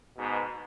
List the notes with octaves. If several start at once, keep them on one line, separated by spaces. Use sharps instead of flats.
G#2 B2